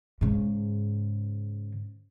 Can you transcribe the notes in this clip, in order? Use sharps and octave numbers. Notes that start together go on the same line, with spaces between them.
G#2 C#3